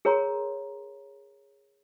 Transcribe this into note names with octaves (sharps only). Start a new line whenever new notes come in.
G#4 A#4 C#5 A#5 C6